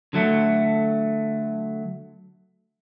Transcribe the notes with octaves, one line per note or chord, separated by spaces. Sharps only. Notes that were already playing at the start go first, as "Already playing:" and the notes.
D3 F#3 A3